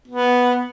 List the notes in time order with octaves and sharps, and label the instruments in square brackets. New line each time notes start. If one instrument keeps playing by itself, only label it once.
[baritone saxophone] B3